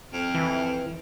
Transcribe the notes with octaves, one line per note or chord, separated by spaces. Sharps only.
F2
E3